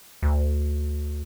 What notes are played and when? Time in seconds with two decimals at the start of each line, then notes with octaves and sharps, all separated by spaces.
0.23 D2